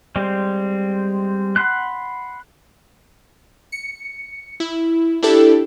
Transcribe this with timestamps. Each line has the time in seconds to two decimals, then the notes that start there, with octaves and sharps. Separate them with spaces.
0.16 G3 G#3 C4
1.56 F#5 B5 C6 F#6
3.72 C#7
4.60 E4
5.22 D4 E4 G4 A4